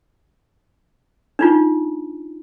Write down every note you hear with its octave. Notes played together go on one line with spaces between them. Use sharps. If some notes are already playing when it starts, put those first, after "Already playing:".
D4 D#4 F4